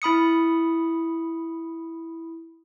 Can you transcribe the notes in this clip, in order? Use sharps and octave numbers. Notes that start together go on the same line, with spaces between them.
E4 B5 D#6 C#7